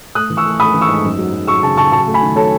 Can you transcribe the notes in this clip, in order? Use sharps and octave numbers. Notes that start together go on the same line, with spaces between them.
A3 D#6 F#6
E3
C#6 E6
A3
A3 B5 D#6
E3
C#6 E6
G#2
F#2
F#3
F#3
F#3 C#6 E6
C#3 A5 C#6
C#3 A5 C#6
F#3 A5 C#6
A3
G#5 B5
D#3
F#3 A4 C#5